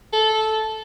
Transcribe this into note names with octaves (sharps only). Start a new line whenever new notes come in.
A4